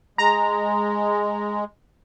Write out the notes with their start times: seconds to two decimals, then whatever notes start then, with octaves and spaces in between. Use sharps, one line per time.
0.18 G#3 A#5